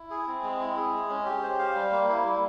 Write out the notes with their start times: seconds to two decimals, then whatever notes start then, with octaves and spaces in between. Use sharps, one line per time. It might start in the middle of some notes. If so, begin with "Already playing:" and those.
Already playing: E4
0.10 G#4
0.27 C4
0.43 G#3
0.60 E4
0.77 G#4
0.93 G#3
1.09 C#4
1.26 G4
1.43 C5
1.59 F5
1.75 G3
1.92 A#3
2.08 E4
2.25 G3